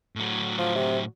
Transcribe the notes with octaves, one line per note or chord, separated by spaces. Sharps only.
A2 F#3
F3
C3